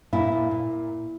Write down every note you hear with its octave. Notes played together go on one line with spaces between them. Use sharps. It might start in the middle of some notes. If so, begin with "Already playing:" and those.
A#2 E4
A#2
A#2